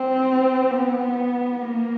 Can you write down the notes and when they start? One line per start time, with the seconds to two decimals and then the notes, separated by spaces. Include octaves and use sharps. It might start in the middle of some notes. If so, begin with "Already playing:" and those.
Already playing: C4
0.70 B3
1.61 A#3